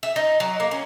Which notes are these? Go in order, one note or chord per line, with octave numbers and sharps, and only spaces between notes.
E5
D#4
F#3
A#3
C#4